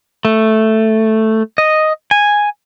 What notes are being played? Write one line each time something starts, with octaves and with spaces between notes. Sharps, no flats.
A3
D#5
G#5